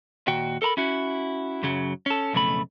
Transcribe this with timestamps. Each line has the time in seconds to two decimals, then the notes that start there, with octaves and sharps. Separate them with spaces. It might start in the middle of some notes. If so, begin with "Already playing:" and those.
0.27 D#2 A#2 F#4 G5
0.62 A4 A#4 A#5 B5
0.77 C#4 E4 F#4
1.63 F#2 C#3 F#3
2.06 C#4 A4
2.33 B1 F2 C#3 A3 B5